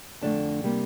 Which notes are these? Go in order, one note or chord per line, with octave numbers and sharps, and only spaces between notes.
F2 D3 A3 D4
C3 G3 A#3